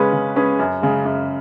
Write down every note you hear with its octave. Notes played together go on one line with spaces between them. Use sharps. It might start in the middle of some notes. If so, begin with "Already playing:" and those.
Already playing: C#3 G#3 C#4 G#4 B4
C#3
G#3 C#4 G#4 B4
F#2
C#3 G#3
F#2